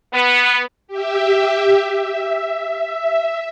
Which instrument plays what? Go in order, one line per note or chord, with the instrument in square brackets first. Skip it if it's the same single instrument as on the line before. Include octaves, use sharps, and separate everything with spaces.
[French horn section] B3
[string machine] G4 E5
E5